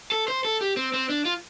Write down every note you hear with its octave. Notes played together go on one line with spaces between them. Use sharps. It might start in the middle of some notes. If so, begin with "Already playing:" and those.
A4
C5
A4
G4
C4
C4
D4
F4